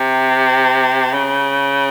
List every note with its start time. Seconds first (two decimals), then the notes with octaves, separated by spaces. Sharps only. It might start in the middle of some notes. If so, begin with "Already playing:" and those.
Already playing: C3
1.13 C#3